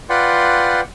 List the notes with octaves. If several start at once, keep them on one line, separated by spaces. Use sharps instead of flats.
F4 B4 D5 F#5 G5 C6